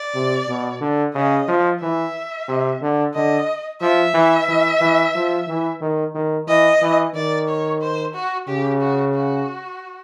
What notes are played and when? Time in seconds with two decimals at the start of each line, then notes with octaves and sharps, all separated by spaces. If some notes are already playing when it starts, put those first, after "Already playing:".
Already playing: D5
0.14 C3
0.48 B2
0.81 D3
1.15 C#3 D#5
1.48 F3
1.81 E3 E5
2.48 C3
2.82 D3
3.14 D3 D#5
3.81 F3 E5
4.14 E3
4.48 E3
4.81 E3
5.15 F3
5.48 E3
5.81 D#3
6.15 D#3
6.47 E3 D#5
6.82 E3
7.14 D#3 D5
7.48 C#5
7.82 C5
8.14 F#4
8.48 C#3 G4
8.81 F#4
9.15 F#4